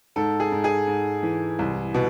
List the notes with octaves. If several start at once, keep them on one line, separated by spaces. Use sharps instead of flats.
G#2 A4
G#4
G#2
G#4
G#2
E3
C2
B2